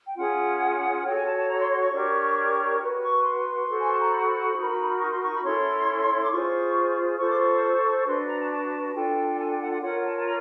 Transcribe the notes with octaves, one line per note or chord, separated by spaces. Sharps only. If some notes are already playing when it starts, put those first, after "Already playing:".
G5
C#4 F4 G#4 F#5
F#4 A4 C#5 G5
G#5
A5
A5
A#5
C6
C6
C#6
D4 G4 A#4 C#5
F#4 B4
C#6
C6
F#4 A4 C5
G#5
A5
A#5
B5
D#4 F#4 A#4
C#6
C6
C#6
B5
C#4 E4 A4 C#5 C6
D6
F4 G#4 C5 C#6
F4 A4 C5 C#6
D6
C#6
D4 F#4 B4 C6
A#5
A5
A5
D4 F4 A4 G5
G#5
G5
F#5
F#5
F4 A#4 C#5 F#5
A5
A5
A#5